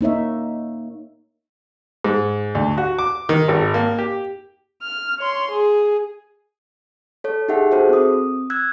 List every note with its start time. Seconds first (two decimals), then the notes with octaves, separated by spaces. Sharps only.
0.01 A#3 D#4 C#5 E5
2.04 G#2
2.55 D2
2.78 F#4
2.99 D6
3.29 D#3
3.48 G#1
3.74 A#3
3.98 G4
4.82 F6
5.19 C#5 C6
5.51 G#4
7.24 A4 C#5
7.48 D#4 G4 G#4 E5 F#5
7.71 F#4 G#4 A4 C5 E5
7.89 C4 D#6
8.50 E6 F#6 G#6